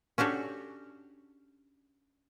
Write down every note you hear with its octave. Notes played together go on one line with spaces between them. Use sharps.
C#4 D4 F#4 G4 A4